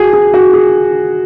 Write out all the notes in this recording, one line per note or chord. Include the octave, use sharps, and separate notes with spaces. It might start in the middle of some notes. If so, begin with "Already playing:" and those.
Already playing: F#4 G#4
G#4
F#4
G#4